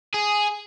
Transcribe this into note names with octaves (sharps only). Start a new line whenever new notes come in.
G#4